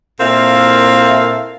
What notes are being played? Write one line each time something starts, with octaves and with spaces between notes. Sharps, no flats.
A#2 C4 E4 A4 A#4 F5